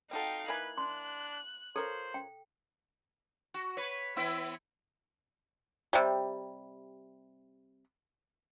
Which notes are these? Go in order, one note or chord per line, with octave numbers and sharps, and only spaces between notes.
C4 D#4 F#4 A4 F5 G5
A#3 E4 B4 G#5 F#6
D4 C6
F3 A4 A#4 C5 C#5
G5
F#4
B4 C#5
E3 B3 E4
C3 G3